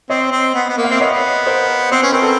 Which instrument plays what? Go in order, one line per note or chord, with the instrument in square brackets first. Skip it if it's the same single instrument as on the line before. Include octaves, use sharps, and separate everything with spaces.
[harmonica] C4 [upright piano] C#5 D#5
[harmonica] C4
B3
B3
A#3
[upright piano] F5
[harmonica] C4 [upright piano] E5
[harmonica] B3 [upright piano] C#5 D#5
[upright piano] A#4 C5
[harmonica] C4 [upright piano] C5
[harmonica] C#4 [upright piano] B4
[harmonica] C4 [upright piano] A#4
[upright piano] A4 B4